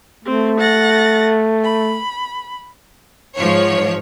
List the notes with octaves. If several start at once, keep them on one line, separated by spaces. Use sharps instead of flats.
A3 C4
F#5 A6 A#6
B5
G#2 F3 C#5